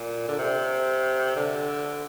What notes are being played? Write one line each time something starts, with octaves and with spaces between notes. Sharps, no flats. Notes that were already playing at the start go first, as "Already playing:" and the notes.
Already playing: A#2
D3
C3
D3